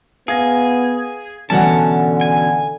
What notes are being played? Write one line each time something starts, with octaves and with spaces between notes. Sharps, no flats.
B3 G#4 F5 G#6 A#6
B2 D3 E3 C#4 F#4 D5 F#5 A5
G#5